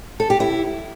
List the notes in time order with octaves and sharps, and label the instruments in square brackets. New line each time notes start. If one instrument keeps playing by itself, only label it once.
[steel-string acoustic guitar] A4
G4
E4